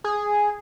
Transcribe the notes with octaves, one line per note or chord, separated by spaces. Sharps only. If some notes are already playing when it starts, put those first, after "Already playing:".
G#4